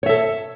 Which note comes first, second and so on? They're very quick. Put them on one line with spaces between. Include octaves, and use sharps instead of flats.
C#5 E5 A4